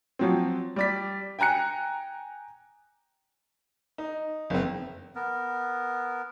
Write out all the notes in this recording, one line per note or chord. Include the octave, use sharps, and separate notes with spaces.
F3 F#3 C4
G3 D5 B6
G5 G#5 A#5 F#6 C#7
D#4
F#1 C4
B3 A#4